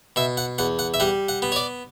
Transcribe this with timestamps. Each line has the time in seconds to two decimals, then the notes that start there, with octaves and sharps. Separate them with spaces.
0.16 B2 E5
0.37 F#5
0.58 E2 F#5
0.79 F#5
0.94 E5
1.00 G3 F#5
1.29 F#5
1.42 B3
1.52 C#5
1.56 D5